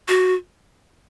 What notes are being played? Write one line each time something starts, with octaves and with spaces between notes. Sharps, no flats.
F#4